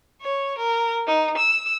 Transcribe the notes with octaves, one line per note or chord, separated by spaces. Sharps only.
C#5
A#4
D#4
E6